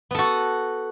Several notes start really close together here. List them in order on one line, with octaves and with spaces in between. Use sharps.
B3 A4 F#4